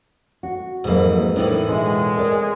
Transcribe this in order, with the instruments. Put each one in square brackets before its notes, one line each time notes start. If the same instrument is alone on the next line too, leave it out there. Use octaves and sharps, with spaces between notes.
[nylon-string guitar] F#4
[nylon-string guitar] F2 F#3 A#3 [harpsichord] G#2 E3
[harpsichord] A2 D#3 E3 [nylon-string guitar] D4 E4
[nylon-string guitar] B2 F4 E5 [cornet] G#3
[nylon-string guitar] A#4 D5